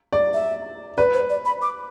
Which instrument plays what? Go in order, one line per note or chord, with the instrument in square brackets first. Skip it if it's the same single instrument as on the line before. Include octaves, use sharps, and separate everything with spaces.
[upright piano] D5
[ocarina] E5
[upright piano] B4 [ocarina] D5
[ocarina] C5
D5
B5
D6